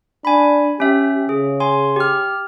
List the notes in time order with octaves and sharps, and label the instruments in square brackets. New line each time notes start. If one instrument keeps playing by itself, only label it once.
[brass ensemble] D4 [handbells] G#5 B5
[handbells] C#4 E5 [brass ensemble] G4
[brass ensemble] C#3 [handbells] G#4
[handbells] G#5 C6
G4 F6